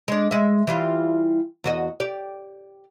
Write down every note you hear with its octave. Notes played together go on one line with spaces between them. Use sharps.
G#3 D4
G#3 E5
E3 G3 F4
E2 F#4 D#5
G4 D5